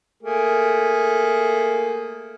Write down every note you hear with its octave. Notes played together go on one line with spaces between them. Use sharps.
A3 A#3 G#4